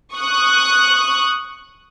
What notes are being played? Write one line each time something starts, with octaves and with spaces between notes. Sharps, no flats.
C#6 D#6 F#6